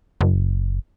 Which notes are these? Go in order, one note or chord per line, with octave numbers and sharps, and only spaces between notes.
F#1